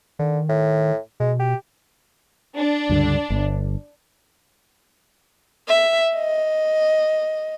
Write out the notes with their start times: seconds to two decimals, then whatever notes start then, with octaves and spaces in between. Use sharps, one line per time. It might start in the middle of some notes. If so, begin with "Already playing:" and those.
0.19 D3 D#3
0.49 A2
1.20 B2 G#3
1.40 G4
2.56 D4
2.89 C#2 G2 D3
3.30 G1
5.68 E5
6.16 D#5